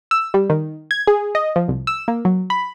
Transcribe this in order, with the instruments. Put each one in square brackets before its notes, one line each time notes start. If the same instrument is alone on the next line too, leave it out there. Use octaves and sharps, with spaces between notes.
[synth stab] E6
G3
D#3
G#6
G#4
D#5
F3
C2
E6
A#3
F#3
B5